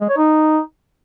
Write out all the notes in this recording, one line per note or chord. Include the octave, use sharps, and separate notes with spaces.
G#3
C#5
D#4